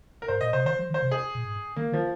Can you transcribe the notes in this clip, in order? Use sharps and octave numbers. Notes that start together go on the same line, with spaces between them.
A#4
G#2 C5
A#2 D#5
C3 C5
D#3 C5
F3
D#3
C5
C3
G#4
A#2
G#2
D#3 A#3
D#3 F3